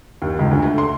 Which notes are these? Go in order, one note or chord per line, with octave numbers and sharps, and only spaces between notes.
D#2
C#2
D2
A3
C6